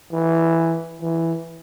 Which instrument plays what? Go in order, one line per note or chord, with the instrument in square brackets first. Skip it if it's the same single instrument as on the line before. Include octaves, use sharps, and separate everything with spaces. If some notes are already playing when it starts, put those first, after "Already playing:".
[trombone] E3
E3